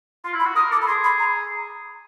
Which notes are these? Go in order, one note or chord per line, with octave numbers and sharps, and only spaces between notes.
F4 C6
E4
B5
F#4
A#4 D#6
A4 D6
B5
G#4 C6
B5
A#5